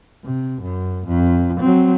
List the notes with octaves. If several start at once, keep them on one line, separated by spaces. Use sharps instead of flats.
C3
F#2
F2
F#3 C4